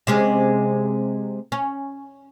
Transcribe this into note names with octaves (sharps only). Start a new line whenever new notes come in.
C3 G#3 C#4
C#4